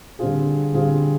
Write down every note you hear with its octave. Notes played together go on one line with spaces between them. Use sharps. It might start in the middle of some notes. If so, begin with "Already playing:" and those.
D3 G3 C4 F4 G#4
D3 G3 C4 F4 G#4